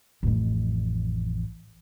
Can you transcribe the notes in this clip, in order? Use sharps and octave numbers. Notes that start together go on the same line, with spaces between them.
A1 F2